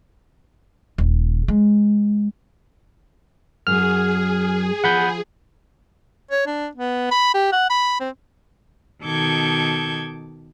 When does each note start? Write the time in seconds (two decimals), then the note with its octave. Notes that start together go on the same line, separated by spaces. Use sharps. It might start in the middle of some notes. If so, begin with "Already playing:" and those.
0.98 D#1
1.48 G#3
3.67 F#2 F#3 G#4 F6
4.84 F3 F#5 B5 G6
6.31 C#5
6.47 D4
6.75 B3
7.11 B5
7.34 G4
7.52 F#5
7.70 B5
8.00 C4
9.03 B2 D#3 A4 D6 G6 G#6